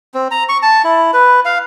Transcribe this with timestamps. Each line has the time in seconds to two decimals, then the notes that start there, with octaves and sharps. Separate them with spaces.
0.14 C4
0.31 A#5
0.49 C#6
0.62 A5
0.84 E4
1.13 B4
1.45 F5